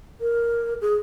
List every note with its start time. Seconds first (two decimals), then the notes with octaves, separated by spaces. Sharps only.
0.21 A#4
0.81 G#4